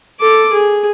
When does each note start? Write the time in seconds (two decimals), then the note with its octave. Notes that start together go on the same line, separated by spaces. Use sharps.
0.21 A4 D6
0.53 G#4